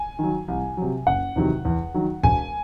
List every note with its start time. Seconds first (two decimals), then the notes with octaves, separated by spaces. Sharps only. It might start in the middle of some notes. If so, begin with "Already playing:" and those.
Already playing: G#5
0.19 D#3 F#3
0.48 C2
0.77 C3 F#3
1.07 F#1 F#5
1.36 E2 C3 D#3 F#3
1.65 E2
1.94 D#3 F#3
2.24 E1 G#5